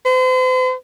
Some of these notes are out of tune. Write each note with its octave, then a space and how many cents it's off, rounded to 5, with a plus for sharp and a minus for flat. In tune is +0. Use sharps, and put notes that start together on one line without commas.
C5 -40